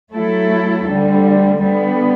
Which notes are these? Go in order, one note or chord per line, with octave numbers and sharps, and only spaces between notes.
F#3 A3 E4 A4
D2 D3 G3
D3 G3 B3